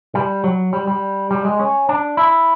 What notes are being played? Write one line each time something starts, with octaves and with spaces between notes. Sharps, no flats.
G3
F#3
G3
G3
G3
G#3
C#4
D4
E4